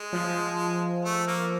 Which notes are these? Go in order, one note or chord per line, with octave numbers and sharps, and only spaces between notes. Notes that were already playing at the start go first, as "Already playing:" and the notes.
Already playing: G#3
F3
A3
A#3